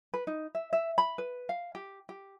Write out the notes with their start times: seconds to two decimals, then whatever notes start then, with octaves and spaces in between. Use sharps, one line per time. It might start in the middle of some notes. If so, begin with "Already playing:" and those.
0.14 B4
0.27 D#4
0.55 E5
0.73 E5
0.98 B5
1.18 B4
1.49 F5
1.75 G4
2.09 G4